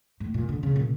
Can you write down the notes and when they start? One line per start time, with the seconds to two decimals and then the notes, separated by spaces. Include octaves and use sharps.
0.20 A2
0.34 A#2
0.49 D3
0.63 C#3
0.76 A#2